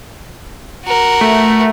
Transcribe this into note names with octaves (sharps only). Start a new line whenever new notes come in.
F#4 A#4
A3